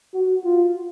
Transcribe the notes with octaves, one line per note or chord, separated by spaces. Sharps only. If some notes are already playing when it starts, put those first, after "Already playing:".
F#4
F4